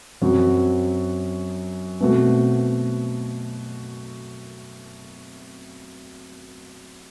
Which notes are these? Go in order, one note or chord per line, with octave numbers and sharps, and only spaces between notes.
F#2 F#3 C4 F#4
B2 A3 C4 F#4